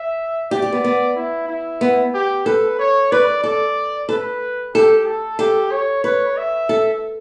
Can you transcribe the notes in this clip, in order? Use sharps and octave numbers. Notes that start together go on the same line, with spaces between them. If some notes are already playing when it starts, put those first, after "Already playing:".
Already playing: E5
G4 D5
G4
B3
B3
E4
E4
B3
G4
A4 B4
C#5
B4 D5
A4 D5
A4 B4
G4 A4
A4
G4 A4
C#5
B4 C#5
E5
A4